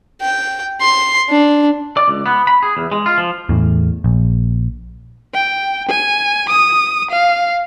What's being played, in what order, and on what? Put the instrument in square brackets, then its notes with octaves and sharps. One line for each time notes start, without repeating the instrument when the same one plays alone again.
[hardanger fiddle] G5
C6
D4
[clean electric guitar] D5
C#2
B3
B5
G#4
E2
G#3
F4
F3
[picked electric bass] E2 A2
A#1
[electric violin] G5
G#5
D#6
F5